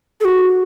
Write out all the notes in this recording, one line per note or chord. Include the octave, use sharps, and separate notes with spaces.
A4
F#4